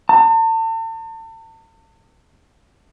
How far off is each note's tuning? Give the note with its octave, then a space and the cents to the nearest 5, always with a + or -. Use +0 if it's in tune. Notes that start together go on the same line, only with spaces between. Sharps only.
A5 +40